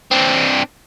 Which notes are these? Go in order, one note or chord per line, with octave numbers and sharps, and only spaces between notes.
C4 D4